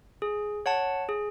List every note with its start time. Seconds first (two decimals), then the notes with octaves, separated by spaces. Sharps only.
0.22 G#4
0.66 C#5 F#5 A5
1.09 G#4